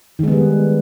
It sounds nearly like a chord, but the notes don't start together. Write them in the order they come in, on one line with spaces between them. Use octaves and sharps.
D#3 G#3 B3 G3